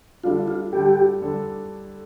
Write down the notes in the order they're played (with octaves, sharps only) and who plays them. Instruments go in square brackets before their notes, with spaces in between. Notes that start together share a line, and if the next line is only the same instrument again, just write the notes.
[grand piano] D3 G3 D4 A4 [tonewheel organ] F4
[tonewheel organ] F4
[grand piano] D3 G3 D4 A4 [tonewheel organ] G4
[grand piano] D3 G3 D4 A4